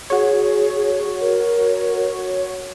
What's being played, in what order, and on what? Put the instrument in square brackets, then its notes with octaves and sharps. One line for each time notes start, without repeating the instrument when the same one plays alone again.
[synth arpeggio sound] F#4 C#5 [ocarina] G#4
[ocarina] A#4